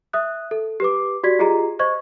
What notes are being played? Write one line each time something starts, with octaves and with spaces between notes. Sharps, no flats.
E5 D#6 F#6
A4
G4 B4 D6
F#4 G4 D5 G#6 B6
F4 G4 G#4 D#5 A#5
C5 D#5 C#6 G#6